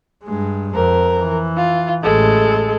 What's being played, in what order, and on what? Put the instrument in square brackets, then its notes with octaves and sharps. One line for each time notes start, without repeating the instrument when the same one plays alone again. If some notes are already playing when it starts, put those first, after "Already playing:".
[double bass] G2 G#3
[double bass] F2 [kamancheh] A#4
[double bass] E3
[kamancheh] F4
[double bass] A1 [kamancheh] G#3 A4